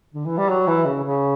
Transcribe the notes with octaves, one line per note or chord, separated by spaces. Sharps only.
D3
E3
G3
F#3
E3
C#3
C#3